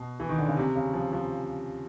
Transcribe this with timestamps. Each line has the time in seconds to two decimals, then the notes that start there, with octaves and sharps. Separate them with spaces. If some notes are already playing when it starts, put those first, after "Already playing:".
Already playing: B2
0.20 E3
0.29 D#3
0.39 D3
0.48 C#3
0.57 C3
0.76 C#3
0.94 F3
1.13 F3